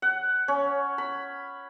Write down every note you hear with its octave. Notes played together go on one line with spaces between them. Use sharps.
F#5
C#4
B5